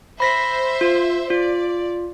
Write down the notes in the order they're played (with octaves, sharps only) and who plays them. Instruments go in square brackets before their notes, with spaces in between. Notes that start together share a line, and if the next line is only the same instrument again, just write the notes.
[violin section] C5 E5 [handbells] B5 A#6 B6
[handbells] F4
[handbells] F4 [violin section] D5